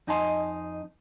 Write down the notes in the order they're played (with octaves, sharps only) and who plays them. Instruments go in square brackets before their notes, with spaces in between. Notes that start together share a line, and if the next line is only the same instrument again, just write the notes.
[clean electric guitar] F2 D#4 D#5 G#5 A5 C6